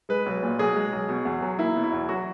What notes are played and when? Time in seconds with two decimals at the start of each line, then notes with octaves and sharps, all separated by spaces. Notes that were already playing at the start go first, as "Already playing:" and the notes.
0.09 G#3 B4
0.26 B1
0.43 A#2
0.59 B1 G#4
0.76 G#3
0.93 B1
1.09 B2
1.25 E2
1.42 F#3
1.59 A#3 E4
1.76 B2
1.84 E4
1.92 E2
2.09 F#3 F#4